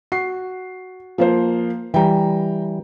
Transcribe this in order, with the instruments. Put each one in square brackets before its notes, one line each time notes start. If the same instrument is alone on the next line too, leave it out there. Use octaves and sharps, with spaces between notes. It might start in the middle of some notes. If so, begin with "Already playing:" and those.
[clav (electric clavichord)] F#4 [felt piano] C7
[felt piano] F3 A#3 C5
[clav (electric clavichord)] E3 G3 [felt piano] G5 A#5